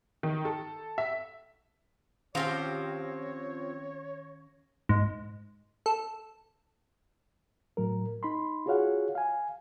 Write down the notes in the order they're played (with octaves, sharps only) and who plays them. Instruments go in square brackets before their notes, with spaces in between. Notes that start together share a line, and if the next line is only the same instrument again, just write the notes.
[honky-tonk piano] D#3
A4
E5
[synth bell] D#3 C#4 A#6 [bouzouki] F3 C4 [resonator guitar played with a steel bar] G4 F5 [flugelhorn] C#5
[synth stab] G#2
A4
[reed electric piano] A2 F#3 A#4
D#4 B5 C6
F4 F#4 G#4 C#5 F5 F#5
F5 G#5